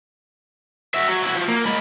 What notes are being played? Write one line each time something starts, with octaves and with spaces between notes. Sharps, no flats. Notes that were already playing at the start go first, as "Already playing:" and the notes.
F#4 E5
F#3
E4 F#4
F3
A#3
G#3 B5